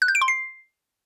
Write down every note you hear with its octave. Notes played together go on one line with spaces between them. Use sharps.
F#6
G6
D7
C6
C7